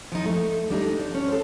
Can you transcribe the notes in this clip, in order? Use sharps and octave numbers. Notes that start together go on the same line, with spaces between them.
F3 D#4
A3 D#4
G3 D4 D#4 A4
D4
C#4
A4 C5